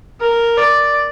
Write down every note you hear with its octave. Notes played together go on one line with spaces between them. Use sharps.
A#4
D5